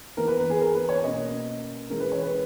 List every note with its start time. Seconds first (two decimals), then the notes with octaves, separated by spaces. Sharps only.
0.17 E3 B3 A#4
0.28 B4
0.40 B4
0.50 G#4
0.61 A#4
0.75 B4
0.89 C#5
1.04 B2 A#3 C#4 D#5
1.90 E3 G#3 C#4 A#4
2.00 B4
2.12 C#5
2.23 B4